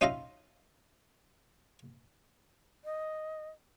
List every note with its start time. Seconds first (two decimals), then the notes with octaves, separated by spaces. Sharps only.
0.01 C#4 D#4 F4 E5 F5 A#5
2.85 D#5